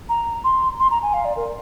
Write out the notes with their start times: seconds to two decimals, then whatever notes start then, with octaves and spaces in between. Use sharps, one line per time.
0.09 A#5
0.44 C6
0.79 C6
0.91 A#5
1.02 G#5
1.14 F5
1.25 D5
1.36 A#4